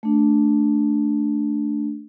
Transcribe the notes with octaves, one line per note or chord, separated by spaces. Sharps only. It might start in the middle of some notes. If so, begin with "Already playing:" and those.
A3 D4